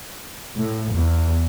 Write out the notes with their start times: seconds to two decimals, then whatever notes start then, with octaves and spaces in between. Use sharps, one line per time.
0.56 A2
0.94 E2